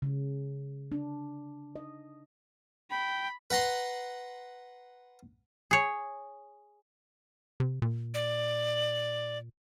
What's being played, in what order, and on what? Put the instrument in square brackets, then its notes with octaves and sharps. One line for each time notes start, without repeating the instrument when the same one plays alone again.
[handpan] C#3
D4
D#5
[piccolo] G5 [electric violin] B5
[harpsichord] B4 F#5 A#5 C6
[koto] G#4 C#5
[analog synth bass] C3
A#2
[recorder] D5